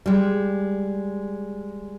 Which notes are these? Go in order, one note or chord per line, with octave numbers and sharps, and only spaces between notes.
G3 G#3